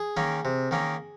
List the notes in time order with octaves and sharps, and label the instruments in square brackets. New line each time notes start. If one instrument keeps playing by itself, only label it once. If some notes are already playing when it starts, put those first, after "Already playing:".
Already playing: [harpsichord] G#4
D#3 A#3 C#4
C3
D#3 A#3 C#4